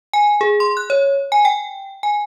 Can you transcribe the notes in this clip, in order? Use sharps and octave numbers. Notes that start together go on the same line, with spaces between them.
G#5
G#4
C6
F#6
C#5
G#5
G5
G#5